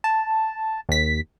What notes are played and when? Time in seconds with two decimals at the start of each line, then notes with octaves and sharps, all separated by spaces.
0.04 A5
0.89 D#2 B6